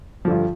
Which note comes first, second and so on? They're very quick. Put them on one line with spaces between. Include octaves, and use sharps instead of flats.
F3 D3 G2